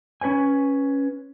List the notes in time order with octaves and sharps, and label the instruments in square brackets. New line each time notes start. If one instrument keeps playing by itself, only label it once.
[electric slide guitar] C#4 B4 C#5 G#5